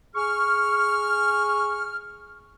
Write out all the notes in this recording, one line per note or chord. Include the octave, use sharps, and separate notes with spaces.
G#4 C#6 F6